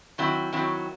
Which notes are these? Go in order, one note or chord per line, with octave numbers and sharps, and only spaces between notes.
D#3 F#3 C4 E4
D#3 F#3 C4 E4